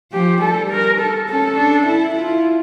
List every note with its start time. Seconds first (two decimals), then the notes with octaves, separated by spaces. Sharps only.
0.13 F3 G4
0.41 G3 A4
0.71 A#4
1.00 A4
1.29 C#4 A4
1.58 D4
1.87 E4
2.15 E4 F4